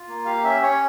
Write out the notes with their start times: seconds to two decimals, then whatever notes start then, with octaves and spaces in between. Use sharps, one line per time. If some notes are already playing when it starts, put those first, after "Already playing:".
Already playing: F4
0.08 A#3
0.25 G4 F5
0.44 C#4 E5
0.62 C#4 C#5